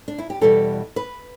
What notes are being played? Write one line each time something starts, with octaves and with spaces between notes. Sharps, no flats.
D4
E4
G4
E2 B2 G3 A4
B4